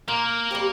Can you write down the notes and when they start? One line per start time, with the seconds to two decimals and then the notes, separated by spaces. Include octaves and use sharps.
0.08 A#2 A#3
0.51 G3 C4 G4